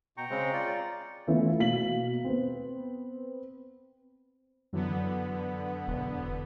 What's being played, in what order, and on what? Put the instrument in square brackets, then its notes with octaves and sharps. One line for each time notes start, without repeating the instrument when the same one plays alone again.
[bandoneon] B2 [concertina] G5 A#5 C#6
[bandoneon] C#3 G#3 C4
F4 D5
[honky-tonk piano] E3 A3 B3 C#4 E4 F4
B2 A#3 F5 B6 F#7
B3 C4
[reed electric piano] F#2 E3 F#3 [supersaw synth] D3 B3
[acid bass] E1